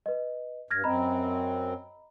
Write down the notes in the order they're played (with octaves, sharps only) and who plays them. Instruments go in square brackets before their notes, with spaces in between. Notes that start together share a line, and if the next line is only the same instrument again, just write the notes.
[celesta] B4 D#5
[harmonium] G2 [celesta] F6 G#6 A#6
[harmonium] F#2 C4 [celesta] D#5 A#5 B5